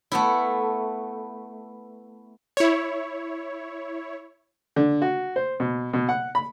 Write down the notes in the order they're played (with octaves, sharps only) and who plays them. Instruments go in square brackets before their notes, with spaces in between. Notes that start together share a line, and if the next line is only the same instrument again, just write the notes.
[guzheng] A3 B3 E4
[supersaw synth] E4 C#5
[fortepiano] D3
F#4
C5
B2
B2
F#5
B5